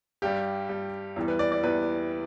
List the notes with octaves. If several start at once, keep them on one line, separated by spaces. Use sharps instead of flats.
G2 G3 G4
G2 G3
E2 E3 G3
B4
D5
D5
E2 E3 G3 B4